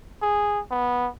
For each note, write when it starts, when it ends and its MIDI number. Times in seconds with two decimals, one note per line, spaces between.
0.22 0.60 68
0.71 1.09 59